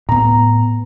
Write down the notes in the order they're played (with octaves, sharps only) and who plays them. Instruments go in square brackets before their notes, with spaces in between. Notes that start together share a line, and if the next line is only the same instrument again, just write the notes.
[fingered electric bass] A2 B3 [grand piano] A#5